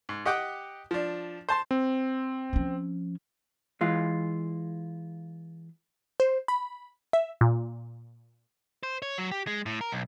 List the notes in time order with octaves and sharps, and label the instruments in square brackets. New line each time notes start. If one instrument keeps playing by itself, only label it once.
[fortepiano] G#2
G4 D#5 F#5 G5 D6
F3 D4
C5 A5 C6
[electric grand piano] C4
[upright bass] F3 C#4
[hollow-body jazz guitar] E3 G#3 F4
[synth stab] C5
B5
E5
A#2
[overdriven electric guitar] C5
C#5
F#3
G4
G#3
A2
A#4
B1